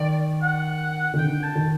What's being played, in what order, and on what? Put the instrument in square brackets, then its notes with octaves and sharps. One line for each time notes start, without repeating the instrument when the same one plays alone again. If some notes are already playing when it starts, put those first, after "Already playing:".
Already playing: [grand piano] D#3 [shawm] D5
[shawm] F#5
[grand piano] D#3
[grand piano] D3 [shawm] G5
[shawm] A5
[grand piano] D#3